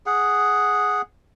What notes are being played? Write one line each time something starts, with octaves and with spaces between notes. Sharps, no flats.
G#4 F#5